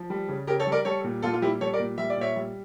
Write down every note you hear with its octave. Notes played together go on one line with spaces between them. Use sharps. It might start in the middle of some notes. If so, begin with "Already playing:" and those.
Already playing: F3
G3
C#3
C#3 G4 A#4
A4 C#5
G3
A#4 D5
G3 A4 C#5
A#2
A#2 F4 A4
F4
G3 E4 G4
G3 A4 C#5
A#4 D5
A#2
G3 E5
D5
A#2 C#5 E5
G3